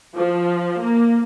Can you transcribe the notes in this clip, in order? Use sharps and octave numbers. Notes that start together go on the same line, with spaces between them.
F3
A#3